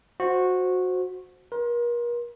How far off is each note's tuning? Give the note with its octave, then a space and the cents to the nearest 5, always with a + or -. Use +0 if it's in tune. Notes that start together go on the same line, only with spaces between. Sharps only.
F#4 -15 C5 +0
A#4 +40 C6 +20